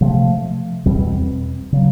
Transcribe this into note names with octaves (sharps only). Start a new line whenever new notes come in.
C3 F3 A3
E2 B2 G3 C4
C#3 F#3